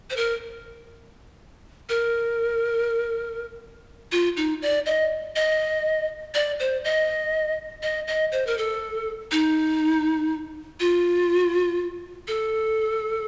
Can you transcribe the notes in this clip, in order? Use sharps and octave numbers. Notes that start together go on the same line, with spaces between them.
C5
A#4
A#4
F4
D#4
D5
D#5
D#5
D5
C5
D#5
D#5
D#5
C5
A#4
A4
D#4
F4
A4